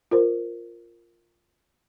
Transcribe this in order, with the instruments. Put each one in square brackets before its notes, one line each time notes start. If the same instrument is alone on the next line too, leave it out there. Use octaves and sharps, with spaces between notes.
[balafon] F4 A#4 C5